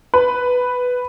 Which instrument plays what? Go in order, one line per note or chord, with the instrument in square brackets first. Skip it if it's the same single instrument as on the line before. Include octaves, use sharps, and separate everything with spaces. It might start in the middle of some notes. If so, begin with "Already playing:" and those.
[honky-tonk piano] B4